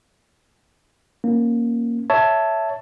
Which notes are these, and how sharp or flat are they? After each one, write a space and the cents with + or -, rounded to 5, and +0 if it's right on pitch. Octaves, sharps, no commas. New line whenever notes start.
A#3 +5 C#4 -10
C#5 +15 E5 +0 A5 +5